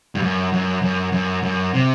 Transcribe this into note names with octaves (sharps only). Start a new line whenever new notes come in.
G2
F#2
F#2
F#2
F#2
F#2
C3